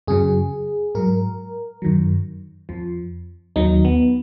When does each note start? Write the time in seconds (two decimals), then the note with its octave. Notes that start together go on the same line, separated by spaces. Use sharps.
0.07 F#2 C#3 F#3 G#4
0.95 G#2 F#3 A#4
1.82 F#2 D#3 F#3
2.69 F2 F3
3.56 D#2 D#3 F#3 D#4
3.85 B3